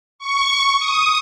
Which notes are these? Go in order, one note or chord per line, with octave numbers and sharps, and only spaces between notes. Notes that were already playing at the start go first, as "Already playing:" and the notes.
C#6
D#6